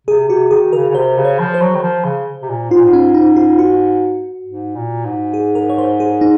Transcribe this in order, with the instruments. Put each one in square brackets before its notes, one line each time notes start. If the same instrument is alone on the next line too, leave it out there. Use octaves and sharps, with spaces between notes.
[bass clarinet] C3 [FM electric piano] G#4
[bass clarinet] C3 [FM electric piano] F#4
[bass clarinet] D#3 [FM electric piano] G#4
[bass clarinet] C#3 [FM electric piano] A#4
[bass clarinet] C#3
[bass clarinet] C3 [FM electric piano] C5
[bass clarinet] C#3
[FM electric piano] C#5
[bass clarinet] F3
[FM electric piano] C5
[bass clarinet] F#3
D#3
F3
C#3
C3
A#2
[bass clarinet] G#2 [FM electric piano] F4
[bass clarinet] A#2
G#2
[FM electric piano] C#4
D#4
F4
F#4
[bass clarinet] G#2
A#2
G#2
[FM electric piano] G#4
A#4
C#5
C5
G#4
D#4